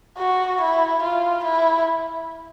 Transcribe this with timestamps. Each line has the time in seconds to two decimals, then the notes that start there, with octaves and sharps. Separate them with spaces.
0.19 F#4
0.61 E4
1.03 F4
1.45 E4